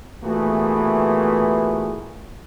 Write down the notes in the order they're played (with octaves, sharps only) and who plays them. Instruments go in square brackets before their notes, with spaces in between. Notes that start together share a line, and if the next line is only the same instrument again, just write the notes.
[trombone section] A#2 E3 A3 B3 F#4 G#4